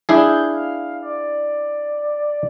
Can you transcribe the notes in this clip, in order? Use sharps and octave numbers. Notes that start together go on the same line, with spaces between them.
D4 E4 G#4 G6
F5
D5